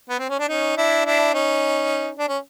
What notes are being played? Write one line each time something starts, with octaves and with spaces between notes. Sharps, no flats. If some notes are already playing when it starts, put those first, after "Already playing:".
B3
C4
C#4
D4
C#4 D#4
D4 E4
D4 E4
C#4 D#4
D4
C#4